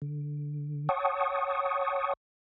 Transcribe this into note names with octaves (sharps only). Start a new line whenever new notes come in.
D3
C#5 F#5 G5 A5 C#6 D#6